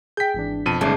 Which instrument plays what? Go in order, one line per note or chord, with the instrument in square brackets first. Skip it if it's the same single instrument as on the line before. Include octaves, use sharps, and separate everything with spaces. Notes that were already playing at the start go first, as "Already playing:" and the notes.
[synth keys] G#4 G5 [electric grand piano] G6 B6
[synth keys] G#1 E3 D4
[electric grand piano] F2 A5 D#7 [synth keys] B2
[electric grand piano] G1 G#2 [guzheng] C#3 A3 D4 [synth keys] C7 C#7